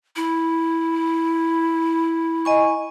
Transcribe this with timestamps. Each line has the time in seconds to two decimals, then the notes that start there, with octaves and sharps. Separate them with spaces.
0.16 E4
2.45 D#5 G#5 C#6